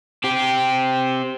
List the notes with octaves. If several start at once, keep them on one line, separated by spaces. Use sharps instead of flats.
C4 G4